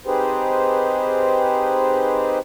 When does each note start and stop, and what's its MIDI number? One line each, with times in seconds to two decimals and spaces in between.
0.06 2.39 60
0.06 2.39 63
0.06 2.39 67
0.06 2.39 68
0.06 2.39 71
0.06 2.39 72